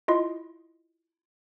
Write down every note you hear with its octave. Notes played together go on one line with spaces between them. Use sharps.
E4 F4 D#5 C6